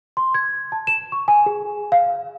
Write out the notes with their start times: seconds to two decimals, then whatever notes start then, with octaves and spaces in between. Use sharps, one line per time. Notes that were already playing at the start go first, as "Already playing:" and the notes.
0.17 C6
0.34 G#6
0.72 A5
0.87 E7
1.12 C#6
1.28 G#5
1.46 G#4
1.92 F5